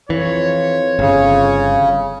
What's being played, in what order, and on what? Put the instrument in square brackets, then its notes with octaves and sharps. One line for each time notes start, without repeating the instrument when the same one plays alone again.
[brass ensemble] F2 F4 C#5 [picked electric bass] E3
[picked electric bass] G1 [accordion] C#3